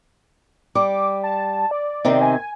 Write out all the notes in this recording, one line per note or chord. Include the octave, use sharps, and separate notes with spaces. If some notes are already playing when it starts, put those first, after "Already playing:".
G3 D6
A5
D5
C3 D#3 C4
G#5